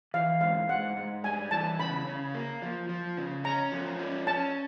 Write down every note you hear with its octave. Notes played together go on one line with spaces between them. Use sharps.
E3 F5
G#2 F5
G#2 F#5
G#2
G3 G#5
E3 A5
C#3 B5
C#3
A#3
F3
F3
C#3
C#4 A#5
F3
C#4
C#4 A5